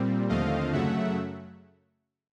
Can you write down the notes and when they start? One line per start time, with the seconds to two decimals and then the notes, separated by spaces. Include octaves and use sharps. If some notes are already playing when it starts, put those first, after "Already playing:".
Already playing: A#2 G3 C4
0.29 D#2 D3 F3 A3 C4 D#5 F5
0.72 F#2 C#3 F#3 A3 E5 F#5